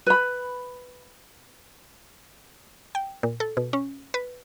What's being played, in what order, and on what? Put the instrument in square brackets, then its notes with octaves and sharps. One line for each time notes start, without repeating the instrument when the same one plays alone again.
[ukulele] B4 B5
[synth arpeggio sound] G5
A#2
A4
B2
C#4
B4